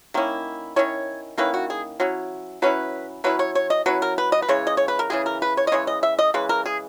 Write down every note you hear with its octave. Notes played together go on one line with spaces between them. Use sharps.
D#3 A#3 C#4 E4
D#3 A#3 C#4 E4 C#5
D#3 A#3 C#4 E4 B4
F#4
G#4
F#3 C#4 E4
F#3 C#4 E4 B4
F#3 C#4 E4 B4
C#5
C#5
D#5
F#3 C#4 E4 B4
A#4
B4
D#5
B4
C#3 E3 G#3 C#5
D#5
C#5
B4
A#4
C#3 E3 G#3 G#4
A#4
B4
C#5
D#5
C#3 E3 G#3 C#5
D#5
E5
D#5
C#3 E3 G#3 B4
A#4
G#4